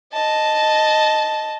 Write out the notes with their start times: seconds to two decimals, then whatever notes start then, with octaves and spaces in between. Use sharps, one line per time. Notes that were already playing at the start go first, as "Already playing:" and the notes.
0.13 D#5 A5